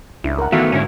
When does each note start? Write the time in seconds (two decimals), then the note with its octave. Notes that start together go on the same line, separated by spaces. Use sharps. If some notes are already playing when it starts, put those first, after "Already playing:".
0.24 C#2 D4 E4
0.38 A#4 F#5
0.52 D#3 E3 A3 B3 F#4 E5 F5
0.72 G#2 D3 C#4 E4